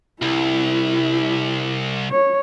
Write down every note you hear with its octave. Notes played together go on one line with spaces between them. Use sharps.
C2 E4
C#5